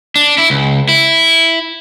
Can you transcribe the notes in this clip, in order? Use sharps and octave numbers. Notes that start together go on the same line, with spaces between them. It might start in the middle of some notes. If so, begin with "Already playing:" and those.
D4
E4
C#2
E4